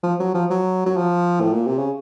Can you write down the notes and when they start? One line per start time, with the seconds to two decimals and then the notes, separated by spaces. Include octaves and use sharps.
0.03 F3
0.19 F#3
0.34 F3
0.50 F#3
0.86 F#3
0.97 F3
1.40 A2
1.53 A#2
1.66 C3
1.78 C#3